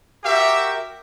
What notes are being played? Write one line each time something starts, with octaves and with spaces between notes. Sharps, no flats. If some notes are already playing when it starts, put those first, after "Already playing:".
F#4 G4 A#4 E5